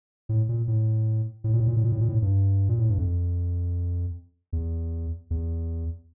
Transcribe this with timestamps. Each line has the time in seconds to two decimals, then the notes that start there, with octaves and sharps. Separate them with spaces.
0.29 A2
0.49 A#2
0.68 A2
1.44 A2
1.53 A#2
1.60 A2
1.68 A#2
1.76 A2
1.84 A#2
1.92 A2
2.00 A#2
2.09 A2
2.22 G2
2.69 A#2
2.79 A2
2.90 G2
2.98 F2
4.53 E2
5.30 E2